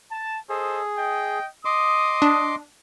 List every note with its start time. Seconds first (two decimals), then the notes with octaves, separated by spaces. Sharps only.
0.12 A5
0.49 G#4 A4 C5 D#5
0.97 D#5 G5
1.65 D#5 C6 D6 D#6
2.22 D4